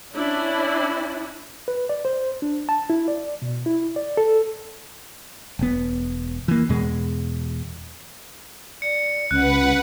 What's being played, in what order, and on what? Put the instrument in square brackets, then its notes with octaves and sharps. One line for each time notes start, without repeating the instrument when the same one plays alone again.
[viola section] C#4 D4 E4
[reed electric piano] B4
D5
C5
D4
A5
E4
D5
B2
E4
D5
A4
[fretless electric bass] E1 B3
E3 A#3
E2 B2 G#3
[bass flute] D5 [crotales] C#7
[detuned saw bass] C#2 [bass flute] C#4 [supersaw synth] B4 F#5 [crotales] F#6